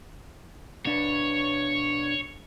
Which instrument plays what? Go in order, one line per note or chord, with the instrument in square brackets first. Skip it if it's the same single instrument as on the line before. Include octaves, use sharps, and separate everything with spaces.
[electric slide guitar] B2 D4 B4 [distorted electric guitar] C#5